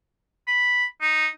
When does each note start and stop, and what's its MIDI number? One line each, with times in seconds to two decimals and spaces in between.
0.47 0.85 83
1.01 1.28 63